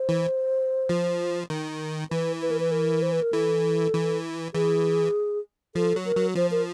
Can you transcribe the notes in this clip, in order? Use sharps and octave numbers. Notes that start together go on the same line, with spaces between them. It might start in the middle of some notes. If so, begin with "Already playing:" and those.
Already playing: C5
E3
F3
D#3
E3 B4
B4
A#4
B4
A#4
C5
B4
A#4
E3 A4
E3
E3 G#4
F3 A4
F#3
A#4
F#3
F3 C5
A#4